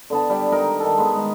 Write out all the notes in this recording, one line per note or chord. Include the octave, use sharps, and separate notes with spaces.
D3 B3 A5
G3 G5 D6
D#4 A#4 D#5 A#5
D#3 A4
G#3 B3
D#4